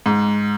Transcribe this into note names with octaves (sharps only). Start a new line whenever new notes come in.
G#2